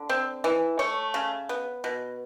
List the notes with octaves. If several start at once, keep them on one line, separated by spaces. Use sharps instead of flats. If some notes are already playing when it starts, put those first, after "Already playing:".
Already playing: D3
C4
E3
A3 C#5
C#3
B3
B2